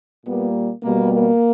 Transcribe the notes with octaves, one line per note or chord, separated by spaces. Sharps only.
A#2 G3 A#3 B3
B2 G3 A#3
A#3